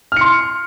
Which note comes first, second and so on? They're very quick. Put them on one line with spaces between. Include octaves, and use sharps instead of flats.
F6 C#7 C6